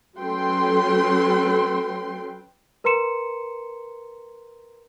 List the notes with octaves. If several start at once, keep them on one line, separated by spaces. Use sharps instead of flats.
F#3 C#4 A4 B4 G5 C6
A#4 B4 A#5 C6 C#7 E7